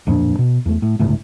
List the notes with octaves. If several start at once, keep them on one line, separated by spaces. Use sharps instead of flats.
D1 F2 A#2 D4
B2
E2 A3
A2
G1 C#2 A2